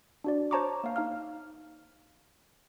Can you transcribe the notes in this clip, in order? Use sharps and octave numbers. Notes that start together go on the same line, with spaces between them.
D4 F#4 D5
C5 C#5 A5 A#5 C#6 D6
A#3 F5
D#4 F5 F6